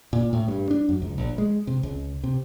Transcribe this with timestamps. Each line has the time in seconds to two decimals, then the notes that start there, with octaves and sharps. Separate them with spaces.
0.13 A#2
0.33 A2
0.48 G2
0.71 D4
0.89 F#2
1.02 C#2
1.18 A#1
1.38 G#3
1.67 C3
1.83 C#2
2.24 C3